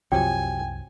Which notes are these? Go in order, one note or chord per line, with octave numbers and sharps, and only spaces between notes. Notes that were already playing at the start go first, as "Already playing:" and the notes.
C2 F#2 C3 F3 F#3 G5 G#5